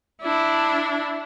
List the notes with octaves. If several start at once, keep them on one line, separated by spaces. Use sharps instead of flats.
D4 E4